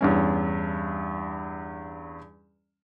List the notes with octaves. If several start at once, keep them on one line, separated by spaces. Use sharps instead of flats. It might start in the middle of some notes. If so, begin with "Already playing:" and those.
E2 G2 C#4